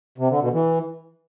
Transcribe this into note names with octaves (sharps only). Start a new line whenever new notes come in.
C3
D3
B2
E3